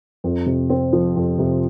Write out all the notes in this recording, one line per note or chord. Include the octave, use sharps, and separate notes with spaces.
F2
C3
C4
F3
F2
C3